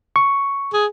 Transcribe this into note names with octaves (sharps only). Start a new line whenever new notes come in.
C#6
G#4